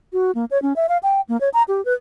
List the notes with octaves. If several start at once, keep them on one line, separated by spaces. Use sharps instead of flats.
F#4
A#3
C#5
C#4
E5
F5
G5
A#3
C#5
A#5
G4
B4